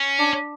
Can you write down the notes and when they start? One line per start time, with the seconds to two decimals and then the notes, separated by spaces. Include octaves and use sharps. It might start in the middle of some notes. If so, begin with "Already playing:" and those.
Already playing: C#4
0.19 D4